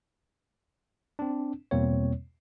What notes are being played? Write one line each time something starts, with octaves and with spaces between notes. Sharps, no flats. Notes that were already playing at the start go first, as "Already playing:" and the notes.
C4 D4
E2 B2 G3 A#3 C4 C#5